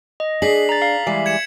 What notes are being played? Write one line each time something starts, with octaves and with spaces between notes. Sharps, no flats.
D#5
D4 G#4 B6 C7 F#7
A#5 A6
F5
E3 G3 G#3
G#6 C#7 E7